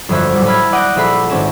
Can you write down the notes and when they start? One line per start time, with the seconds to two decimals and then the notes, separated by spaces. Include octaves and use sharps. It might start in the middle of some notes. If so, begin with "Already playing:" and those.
0.09 G1 F2 F#3 C5 E5 G#5
0.34 A2 F#3 G3
0.46 A5 B5 E6 F6 G#6
0.72 D5 F#5 D#6 G6 A#6 D7
0.96 A#1 A4 E5 B5 C7
1.30 G#1 C4 C#4 A5 E7